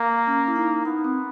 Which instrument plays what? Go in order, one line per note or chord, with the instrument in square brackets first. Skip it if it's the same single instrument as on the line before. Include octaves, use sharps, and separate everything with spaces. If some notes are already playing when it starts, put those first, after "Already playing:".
Already playing: [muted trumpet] A#3
[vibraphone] C#4
E4
D#4
[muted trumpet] B3 [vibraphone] D#4
[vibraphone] C4